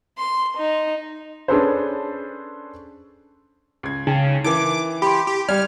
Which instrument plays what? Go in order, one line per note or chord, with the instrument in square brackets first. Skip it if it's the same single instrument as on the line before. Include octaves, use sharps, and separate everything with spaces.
[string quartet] C6
D#4
[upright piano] C#4 D4 G#4 A4 B4 C5
[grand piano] C#2 G#6
[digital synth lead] C#3 [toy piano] D#4 G5
[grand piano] E3 [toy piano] D#4 A#4 F#5 [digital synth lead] D6
[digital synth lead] G4 [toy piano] B5 C6
[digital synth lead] G4
[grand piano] G3 [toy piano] D5 F#5 [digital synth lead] F6